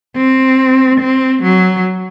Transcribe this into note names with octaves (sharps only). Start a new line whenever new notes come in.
C4
C4
F#3